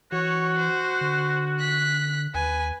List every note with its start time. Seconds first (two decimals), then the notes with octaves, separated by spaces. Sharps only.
0.12 E3 F#4 C#5
0.59 C5
1.01 D3
1.59 F#6 B6
2.34 D#2 B4 G#5